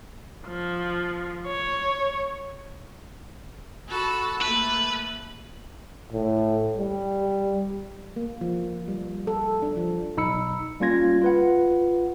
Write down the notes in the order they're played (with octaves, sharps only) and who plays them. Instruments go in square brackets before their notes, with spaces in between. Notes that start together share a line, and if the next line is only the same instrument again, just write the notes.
[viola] F3
C#5
[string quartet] F#4 A4 B5
[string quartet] A3 A#3 [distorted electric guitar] B4
[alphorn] A2
G3
[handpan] A#3
F3
G3
A4
D4
F3
[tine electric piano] B1 D#4 B5 E6 C#7
G3 A#3 C#4 F4 G#6 A#6
F4 B4 F#5